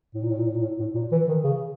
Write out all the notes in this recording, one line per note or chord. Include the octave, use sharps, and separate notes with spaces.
A2
A#2
A2
A#2
A2
A#2
A2
A2
A#2
E3
D#3
C#3